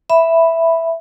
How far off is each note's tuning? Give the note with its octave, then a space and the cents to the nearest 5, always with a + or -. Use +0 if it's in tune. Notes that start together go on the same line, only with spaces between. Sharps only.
E5 +0 B5 +0